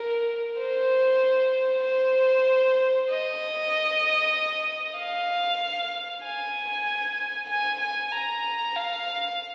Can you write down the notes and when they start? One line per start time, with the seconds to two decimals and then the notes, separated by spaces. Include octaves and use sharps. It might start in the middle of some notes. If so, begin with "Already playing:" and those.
Already playing: A#4
0.59 C5
1.84 C5
3.10 D#5
4.98 F5
6.25 G#5
7.49 G#5
7.81 G#5
8.12 A#5
8.76 F5